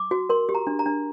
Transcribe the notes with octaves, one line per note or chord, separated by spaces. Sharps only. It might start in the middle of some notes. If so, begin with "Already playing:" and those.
Already playing: D6
F#4
A#4 C6
G4
A#5
D4
A#5
D4